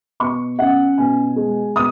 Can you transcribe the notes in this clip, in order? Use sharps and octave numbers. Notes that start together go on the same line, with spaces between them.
B2 C#6
C#4 F#5
B2 G#5
G#3
B2 D#6